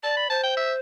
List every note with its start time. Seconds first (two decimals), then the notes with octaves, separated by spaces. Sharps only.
0.03 D5 A5
0.17 B5
0.30 C5 A5
0.43 G5
0.57 E5